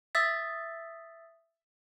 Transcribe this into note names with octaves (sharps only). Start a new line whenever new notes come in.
E5 D#6 E6 A6 B6